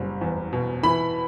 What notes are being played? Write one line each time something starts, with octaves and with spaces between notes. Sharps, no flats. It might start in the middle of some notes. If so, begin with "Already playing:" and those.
Already playing: F#1 G3
E2
B2
E3 B5